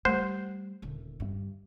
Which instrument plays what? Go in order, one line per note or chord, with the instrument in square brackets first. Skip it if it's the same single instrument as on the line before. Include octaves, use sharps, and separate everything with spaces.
[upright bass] G3 [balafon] A3 [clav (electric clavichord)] C5
[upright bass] D#1 D3
G2